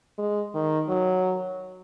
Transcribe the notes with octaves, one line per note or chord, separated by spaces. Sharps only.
G#3
D#3
F#3